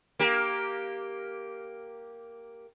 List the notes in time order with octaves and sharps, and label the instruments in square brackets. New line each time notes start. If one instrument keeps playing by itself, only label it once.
[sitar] A#3 G4